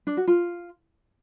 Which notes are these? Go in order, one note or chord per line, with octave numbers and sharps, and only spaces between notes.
D4
F#4
F4